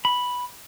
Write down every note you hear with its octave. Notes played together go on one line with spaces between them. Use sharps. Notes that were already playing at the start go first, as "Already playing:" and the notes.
B5